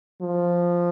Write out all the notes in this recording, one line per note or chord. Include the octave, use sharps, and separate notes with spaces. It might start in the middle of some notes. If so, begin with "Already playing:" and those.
F3